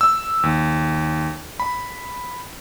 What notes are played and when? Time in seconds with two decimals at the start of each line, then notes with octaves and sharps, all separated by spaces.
0.01 E6
0.43 D#2
1.60 B5